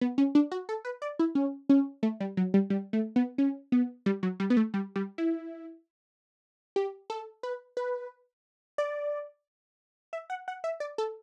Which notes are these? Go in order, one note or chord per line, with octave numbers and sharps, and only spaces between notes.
B3
C#4
D4
F#4
A4
B4
D5
E4
C#4
C#4
A3
G3
F#3
G3
G3
A3
B3
C#4
B3
G3
F#3
G3
B3
A3
G3
G3
E4
G4
A4
B4
B4
D5
E5
F#5
F#5
E5
D5
A4